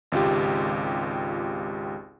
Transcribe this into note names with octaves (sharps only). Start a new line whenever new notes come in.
G#1 C#2 F4 G4